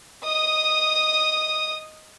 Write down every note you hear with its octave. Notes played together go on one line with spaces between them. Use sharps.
D#5 D#6